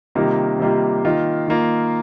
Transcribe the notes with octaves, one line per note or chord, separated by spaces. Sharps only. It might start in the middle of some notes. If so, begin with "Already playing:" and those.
C3 D#3 G3 A#3 F4
C3 D#3 G3 A#3 F4
D#3 A#3 F4
D#3 A#3 F4